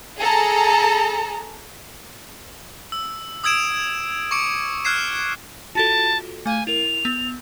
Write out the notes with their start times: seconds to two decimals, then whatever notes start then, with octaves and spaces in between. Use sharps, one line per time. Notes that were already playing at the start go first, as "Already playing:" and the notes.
0.18 G#4 A4 A5 A#5
2.92 E6
3.44 D#6 E6 G#6 D7 E7
4.31 C#6 D6 C#7 D7
4.85 F6 F#6 G#6 C7 E7
5.75 F4 F#4 A4 A5
6.46 A3 F5 G#5
6.67 E4 A#4 F7
7.05 B3